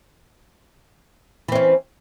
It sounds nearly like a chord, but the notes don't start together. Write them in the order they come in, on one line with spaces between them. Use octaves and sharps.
E3 C4 C#4